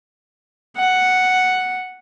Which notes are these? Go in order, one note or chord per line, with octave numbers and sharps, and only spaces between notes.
F#5